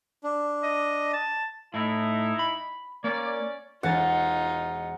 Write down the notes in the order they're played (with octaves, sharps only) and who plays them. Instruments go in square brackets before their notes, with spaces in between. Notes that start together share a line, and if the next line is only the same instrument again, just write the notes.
[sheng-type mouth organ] D4
[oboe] D#5
A5
[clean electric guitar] A2 [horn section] D#4 E4
[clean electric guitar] B5
[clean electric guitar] A#3 [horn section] C#4 A#4 D5
[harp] E1 G#5 A6 [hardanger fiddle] D#4 F4 [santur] F#5